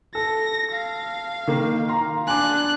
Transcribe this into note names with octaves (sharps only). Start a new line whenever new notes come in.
A4 A#6
F5
D#3 A#3
F5 A#5 C6
D4 G#5 D6 F#6